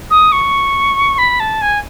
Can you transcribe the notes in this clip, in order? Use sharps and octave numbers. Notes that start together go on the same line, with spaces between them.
D#6
C#6
B5
A5
G#5